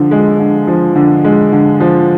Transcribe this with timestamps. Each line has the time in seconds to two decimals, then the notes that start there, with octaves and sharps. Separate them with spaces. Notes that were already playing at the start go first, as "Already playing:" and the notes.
Already playing: D3 F3
0.11 G#3
0.39 D3
0.67 F3
0.96 D3
1.24 G#3
1.52 D3
1.80 F3